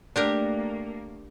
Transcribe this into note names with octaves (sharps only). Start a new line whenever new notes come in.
A3 A#3 D4 G4 A#4